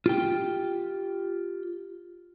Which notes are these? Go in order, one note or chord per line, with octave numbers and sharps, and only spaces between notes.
F4 G4 G5